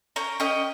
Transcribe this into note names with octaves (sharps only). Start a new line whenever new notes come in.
C#4 G5 A#5
C#4 D#5 G5